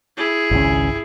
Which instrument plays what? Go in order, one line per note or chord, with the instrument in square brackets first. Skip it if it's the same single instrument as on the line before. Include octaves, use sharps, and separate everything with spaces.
[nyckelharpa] E4 G#4
[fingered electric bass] G#1 C#2 C#4